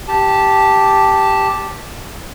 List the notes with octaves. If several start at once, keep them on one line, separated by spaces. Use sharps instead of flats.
G4 A5